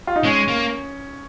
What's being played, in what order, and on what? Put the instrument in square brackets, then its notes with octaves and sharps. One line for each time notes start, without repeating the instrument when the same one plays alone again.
[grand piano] F4
D#4
[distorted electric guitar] G#3 [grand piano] C#4
[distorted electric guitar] A#3